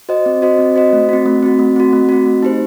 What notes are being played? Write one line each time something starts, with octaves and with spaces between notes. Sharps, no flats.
F#4 C5 D#5
C4
F#4 C5 D#5
C4
F#4 C5 D#5
A3
C4 F#4
A3
C4 F#4
A3
C4 F#4
A3
C4 F#4
A3
D#4 G4 C5